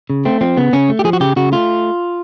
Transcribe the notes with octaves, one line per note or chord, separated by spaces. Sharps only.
C#3
A3 C4
F3 C4
C#3 B3
C#3 C#4
A3
G4
F3 G#4
F#4
C#3 G4
C#3 F#4
A3 F4